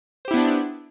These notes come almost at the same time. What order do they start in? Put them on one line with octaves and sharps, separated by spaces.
C5 G4 E4 B3 D4